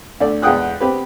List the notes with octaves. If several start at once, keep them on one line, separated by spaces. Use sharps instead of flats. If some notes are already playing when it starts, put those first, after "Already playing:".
D2 A4 D5
E2 G#3 F#5 G5 D#6 F#6
C4 G4 B4